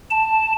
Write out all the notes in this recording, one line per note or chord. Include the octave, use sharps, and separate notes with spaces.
A5